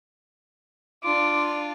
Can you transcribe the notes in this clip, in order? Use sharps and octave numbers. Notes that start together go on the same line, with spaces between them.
D4 F4 D6